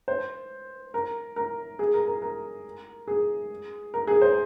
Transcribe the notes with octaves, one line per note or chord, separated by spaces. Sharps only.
C5
A#4
A#4
G#4
A#4
A#4
A#4
G#4
A#4
G#4
C5